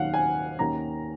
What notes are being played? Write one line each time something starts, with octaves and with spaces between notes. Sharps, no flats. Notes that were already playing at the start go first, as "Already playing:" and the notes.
Already playing: D#2 D#3 F#3 C#4 F5 F#5
G#5
D#2 D#3 A#3 C#4 A#5